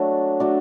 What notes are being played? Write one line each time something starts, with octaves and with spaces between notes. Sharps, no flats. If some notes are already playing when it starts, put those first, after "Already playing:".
Already playing: F#3 A3 D4
F#3 A3 D4